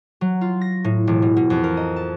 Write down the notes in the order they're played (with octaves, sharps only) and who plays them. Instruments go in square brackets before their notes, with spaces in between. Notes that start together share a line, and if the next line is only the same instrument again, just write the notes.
[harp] F#3
F4
A#6
A2
E1
B2
B2
F2
A#4
D#5
A5